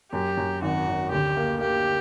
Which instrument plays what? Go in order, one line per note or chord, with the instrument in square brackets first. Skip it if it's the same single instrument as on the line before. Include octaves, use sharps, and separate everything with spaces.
[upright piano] F#2 [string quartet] G4
[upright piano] F#2
[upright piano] G#1 [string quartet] F#4
[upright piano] G#1
[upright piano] D2 [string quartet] G4
[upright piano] A#3
[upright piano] A#3 [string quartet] G4